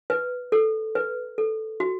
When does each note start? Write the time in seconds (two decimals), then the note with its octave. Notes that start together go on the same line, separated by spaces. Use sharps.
0.10 B4
0.52 A4
0.95 B4
1.38 A4
1.80 F#4